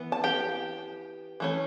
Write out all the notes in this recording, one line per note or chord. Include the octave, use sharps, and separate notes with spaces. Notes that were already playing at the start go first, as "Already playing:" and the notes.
Already playing: E3 B3
A5
G4 G5
E3 A3 C#4